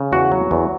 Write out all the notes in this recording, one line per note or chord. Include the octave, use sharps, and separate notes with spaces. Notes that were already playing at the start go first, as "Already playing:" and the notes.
Already playing: C#3
E2 F#4
F#3
E2